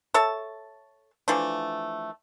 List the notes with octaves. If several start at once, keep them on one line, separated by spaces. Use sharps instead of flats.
A4 C#5 E5 A5
E3 F3 A3 D4